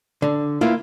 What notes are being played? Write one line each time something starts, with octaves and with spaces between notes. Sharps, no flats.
D3
A#3 E4 F4 B4